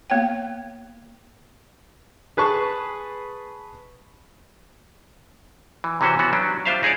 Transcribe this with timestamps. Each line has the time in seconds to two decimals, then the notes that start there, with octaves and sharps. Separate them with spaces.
0.10 A#3 B3 C#5 G5
2.37 G#4 B4 A5 C#6
5.84 E3
6.01 C3 E3 C#4 F#4 C5
6.19 E3 B3 C#4 F#4
6.33 F#3 G3 C#4 D4
6.65 G3 D4 F4 C5 E5 F5
6.83 D#4 G#4 C#5 D5